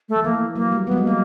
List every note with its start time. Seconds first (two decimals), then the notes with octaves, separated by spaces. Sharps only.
0.09 A3
0.16 F3
0.24 E3 A#3
0.55 F#3 A#3
0.72 G3
0.86 F#3 B3
0.91 G#3
0.97 G3
1.02 F#3 A#3